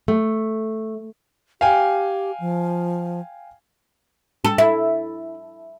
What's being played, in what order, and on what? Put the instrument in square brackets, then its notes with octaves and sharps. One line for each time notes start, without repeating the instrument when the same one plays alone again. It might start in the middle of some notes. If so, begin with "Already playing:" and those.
[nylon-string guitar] A3
[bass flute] G4 [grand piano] F5 G5 G#5
[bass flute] F3
[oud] A4
E4